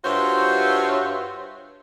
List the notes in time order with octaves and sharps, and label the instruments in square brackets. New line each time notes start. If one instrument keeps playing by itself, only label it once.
[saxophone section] G2 F4 F#4 C5 C#5 E5